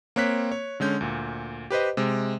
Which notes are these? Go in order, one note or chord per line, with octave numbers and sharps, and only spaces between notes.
A#3 C4 C#5 F#6 B6
C#5
D3 G#3 C#4 G6
D2 A#2
G4 B4 C5 D#5
C3 G#3